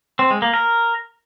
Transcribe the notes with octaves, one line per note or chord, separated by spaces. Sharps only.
C4
G#3
A#3
A#4